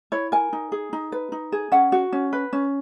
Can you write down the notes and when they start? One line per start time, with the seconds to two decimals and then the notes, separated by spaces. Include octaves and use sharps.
0.12 E4 C#5
0.32 A#4 G#5
0.53 D#4
0.72 G#4
0.93 D#4
1.12 B4
1.32 D#4
1.52 G#4
1.72 C#4 F#5
1.92 F#4
2.13 C#4
2.33 B4
2.53 C#4